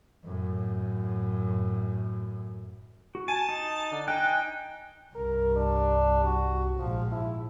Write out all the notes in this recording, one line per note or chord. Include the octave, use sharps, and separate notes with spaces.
F#2 A2
F#4
G#5 A5
D#4
D3
D#4 G5 G#5 F#6
C2 G2 A#4
D4
F#4
A#1 G#2 F3
E4